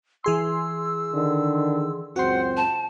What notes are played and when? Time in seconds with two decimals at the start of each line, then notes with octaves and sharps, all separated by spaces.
0.24 E3 G#4 C6 E6
1.12 D3 D#3
2.16 C#2 F#2 C4 F#4 C5 F#5 C6
2.57 A5